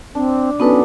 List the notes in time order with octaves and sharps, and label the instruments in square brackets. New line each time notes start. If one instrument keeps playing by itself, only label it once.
[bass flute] C4 [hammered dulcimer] D4
[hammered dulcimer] F#3 A4 D5 [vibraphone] B3 D#4 B4 [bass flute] C#4